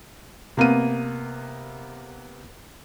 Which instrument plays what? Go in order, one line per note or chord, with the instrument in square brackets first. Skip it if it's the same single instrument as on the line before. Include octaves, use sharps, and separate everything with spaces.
[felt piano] C3 A#3 B3 D#7